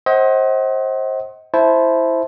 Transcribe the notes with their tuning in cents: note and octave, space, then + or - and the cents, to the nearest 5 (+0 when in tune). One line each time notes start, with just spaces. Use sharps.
C5 +25 D#5 +35 F#5 +30
E4 +0 C5 +0 A5 -25